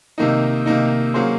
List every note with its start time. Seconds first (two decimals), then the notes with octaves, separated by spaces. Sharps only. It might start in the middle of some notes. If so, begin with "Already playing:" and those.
0.18 C3 D#3 A#3 D#4
0.66 C3 D#3 A#3 D#4
1.14 F#3 A#3 C#4 G#4 C5